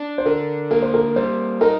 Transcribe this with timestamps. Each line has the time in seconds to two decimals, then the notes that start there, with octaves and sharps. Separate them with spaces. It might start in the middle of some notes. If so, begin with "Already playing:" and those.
Already playing: D4
0.18 C5
0.26 D3 A#4
0.71 A#3 A#4
0.82 C5
0.94 A#4
1.16 G3 C5
1.61 D#4 A#4